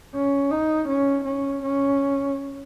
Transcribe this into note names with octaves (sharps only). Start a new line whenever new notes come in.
C#4
D#4
C#4
C#4
C#4